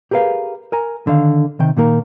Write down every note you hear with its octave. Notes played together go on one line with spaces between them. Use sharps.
G4 G#4 A#4 B4 F5
A#4 G#5 A#5
D3 D#3 F5
C3 D#3 G5
A#2 D#3 A#3 A#4